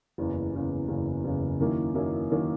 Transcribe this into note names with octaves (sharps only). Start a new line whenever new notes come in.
F#1 E2 C#3
F#1 E2 C#3
F#1 E2 C#3
F#1 E2 C#3
F#2 D#3 A#3 E4
F#2 D#3 A#3 E4
F#2 D#3 A#3 E4